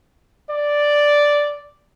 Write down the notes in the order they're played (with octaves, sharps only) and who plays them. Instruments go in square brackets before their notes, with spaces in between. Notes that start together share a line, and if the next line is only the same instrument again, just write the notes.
[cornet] D5